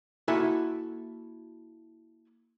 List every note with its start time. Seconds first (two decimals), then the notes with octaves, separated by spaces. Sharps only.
0.28 A#3 E4 F#4 A4 E5 G#5